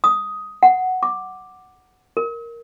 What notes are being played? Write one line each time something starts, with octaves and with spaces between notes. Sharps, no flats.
D#6
F#5
D6
A#4